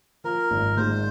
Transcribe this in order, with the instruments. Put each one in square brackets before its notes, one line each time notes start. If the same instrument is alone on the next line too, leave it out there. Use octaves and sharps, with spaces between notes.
[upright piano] F3 [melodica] A#4
[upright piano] G#1
[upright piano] G#2 [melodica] C5